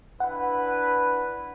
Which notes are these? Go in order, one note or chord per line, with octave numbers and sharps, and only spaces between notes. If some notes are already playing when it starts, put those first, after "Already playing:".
D4 E4 B4 F#5